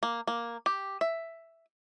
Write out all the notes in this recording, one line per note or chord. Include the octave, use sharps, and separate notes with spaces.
A#3
A#3
G4
E5